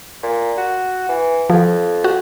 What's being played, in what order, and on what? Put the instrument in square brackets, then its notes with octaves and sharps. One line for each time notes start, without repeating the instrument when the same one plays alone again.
[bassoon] A#2
F#4
E3
[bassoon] F2 [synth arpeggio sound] F3
[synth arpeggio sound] F#4